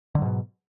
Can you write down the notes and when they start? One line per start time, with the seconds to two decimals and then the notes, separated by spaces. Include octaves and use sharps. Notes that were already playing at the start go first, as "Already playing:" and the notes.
0.15 D3
0.18 F#3
0.22 G#2
0.25 B2